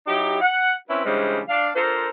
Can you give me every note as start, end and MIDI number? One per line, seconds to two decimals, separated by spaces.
0.07 0.38 54
0.07 0.38 63
0.07 0.38 64
0.07 0.38 67
0.41 0.73 78
0.89 1.04 60
0.89 1.04 61
0.89 1.04 64
0.89 1.04 71
1.04 1.40 49
1.04 1.40 52
1.04 1.40 55
1.04 1.40 56
1.04 1.40 62
1.04 1.40 72
1.49 1.69 62
1.49 1.69 77
1.75 2.06 62
1.75 2.06 65
1.75 2.06 69
1.75 2.06 70
1.75 2.06 72